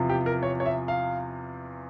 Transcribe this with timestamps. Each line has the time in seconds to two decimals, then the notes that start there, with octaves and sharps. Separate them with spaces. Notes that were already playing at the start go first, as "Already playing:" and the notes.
Already playing: E2 C3 F3
0.10 G4
0.26 A#4
0.43 C#5
0.60 C#5
0.66 E5
0.88 F5